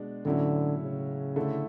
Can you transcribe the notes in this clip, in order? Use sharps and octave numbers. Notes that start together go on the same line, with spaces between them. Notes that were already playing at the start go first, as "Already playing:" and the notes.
Already playing: B2 G#3 D4
A2 D3 F#3 C#4 E4
C#3
D3 A3 E4